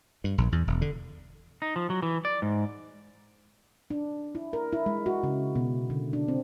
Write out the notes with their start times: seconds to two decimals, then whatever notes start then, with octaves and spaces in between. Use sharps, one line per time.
0.24 G2
0.38 A#1
0.52 E2
0.67 E1
0.81 D3
1.62 D#4
1.76 F3
1.90 F#3
2.02 E3
2.25 D5
2.42 G#2
3.90 D4
4.35 E4
4.53 A#4
4.72 E4
4.86 G#3
5.06 F#4
5.23 C#3
5.55 B2
5.90 D3
6.13 D4
6.28 C4